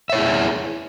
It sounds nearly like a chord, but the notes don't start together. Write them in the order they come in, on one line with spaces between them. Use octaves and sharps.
E5 C#5 E4 G#4